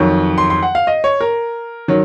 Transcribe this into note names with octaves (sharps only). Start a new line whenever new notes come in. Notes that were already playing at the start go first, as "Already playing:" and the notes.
Already playing: F2 D#3 F#3 C#6
C6
C6
F#5
F5
D#5
C#5
A#4
D#3 F#3